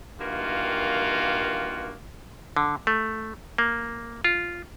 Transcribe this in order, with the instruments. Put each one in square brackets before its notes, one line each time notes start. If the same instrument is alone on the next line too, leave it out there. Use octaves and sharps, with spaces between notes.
[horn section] G2 D#3 E3 A#3 F4 F#4
[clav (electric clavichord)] D3
A3
A#3
F4